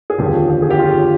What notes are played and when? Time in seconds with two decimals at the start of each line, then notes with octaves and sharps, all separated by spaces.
0.10 G#4
0.18 F1 D#2 D3 F3 G4
0.49 G4
0.62 G#4
0.70 G4
0.79 F4